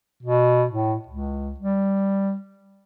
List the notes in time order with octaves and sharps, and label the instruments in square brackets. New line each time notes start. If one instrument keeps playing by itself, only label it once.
[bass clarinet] B2
A2
C#2
G3